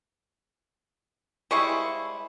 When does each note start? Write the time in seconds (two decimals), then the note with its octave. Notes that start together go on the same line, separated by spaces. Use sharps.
1.51 G3 G#3 E4 C5 F5 C#6